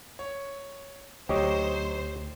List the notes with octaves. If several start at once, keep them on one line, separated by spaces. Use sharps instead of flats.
C#5
D2 F#3 D#4 G4 C5 C#5 D#5